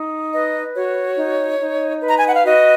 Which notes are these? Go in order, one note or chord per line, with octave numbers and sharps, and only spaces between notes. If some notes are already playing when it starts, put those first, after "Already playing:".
Already playing: D#4
B4 D#5
F#4 C#5
D#4
D#4
B4
A#5
G#5
F#5
F5
F#4 D#5